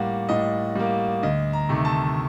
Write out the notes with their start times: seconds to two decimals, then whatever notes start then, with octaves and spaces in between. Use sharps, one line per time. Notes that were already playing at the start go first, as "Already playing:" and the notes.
Already playing: A2 G3 A#3 F#5
0.29 A2 D#5
0.75 G3 A#3
1.23 D2 D#5
1.53 A#5
1.69 C3 D#3 A3
1.85 A5